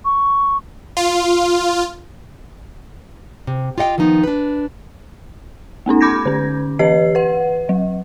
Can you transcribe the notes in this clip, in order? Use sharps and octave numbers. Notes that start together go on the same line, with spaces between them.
C#6
F4
C3
F4 G4 D#5 F#5 G5
D#3 F3 B3 D#4
D4 B4
A3 B3 C#4 D#4
B5 D6 G6 G#6 A#6
D3 C#4
E3 G4 B4 D#5 C7
B4 F#5
F#3